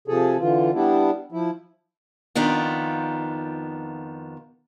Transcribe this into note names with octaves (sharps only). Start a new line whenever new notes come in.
C3 F3 G#4 A4
D3 E3 F4
G3 B3 D4 E4
F3 E4
F2 D#3 B3 D4 F4